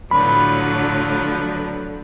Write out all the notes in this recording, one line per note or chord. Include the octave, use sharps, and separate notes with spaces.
A2 D3 F3 F#3 B4 B5